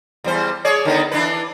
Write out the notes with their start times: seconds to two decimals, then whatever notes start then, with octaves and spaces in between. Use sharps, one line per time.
0.24 E2 G3 C5
0.65 G#4 C#5 D5
0.85 D3 D#3 B3
1.11 E3 D4 B4